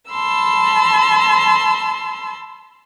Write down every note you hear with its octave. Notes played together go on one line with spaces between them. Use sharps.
A5 B5 C6 E6